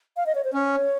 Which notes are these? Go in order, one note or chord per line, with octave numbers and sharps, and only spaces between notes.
F5
D#5
C#5
C5
C#4 C#5